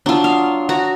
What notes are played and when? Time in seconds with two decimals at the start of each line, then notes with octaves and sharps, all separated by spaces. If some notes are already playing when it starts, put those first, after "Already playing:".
0.06 F#3 D4 F4 D#6 E6
0.24 F5
0.69 F#4 A#5